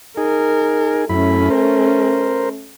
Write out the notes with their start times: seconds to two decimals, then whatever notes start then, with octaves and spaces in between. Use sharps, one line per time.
0.17 D#4 G#4 A#4
1.09 F#2 A3 C#4 E4 B5
1.50 A#4 C5